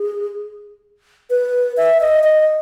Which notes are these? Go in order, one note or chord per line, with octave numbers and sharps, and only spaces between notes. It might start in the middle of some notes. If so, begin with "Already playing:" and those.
Already playing: G#4
B4
E5
D#5
D#5